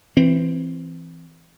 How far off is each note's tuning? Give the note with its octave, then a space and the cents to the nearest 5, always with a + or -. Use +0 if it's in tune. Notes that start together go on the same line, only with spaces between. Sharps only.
E3 +15 C4 +0